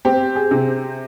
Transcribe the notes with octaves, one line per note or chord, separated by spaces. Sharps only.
C4 G4
G#4
C3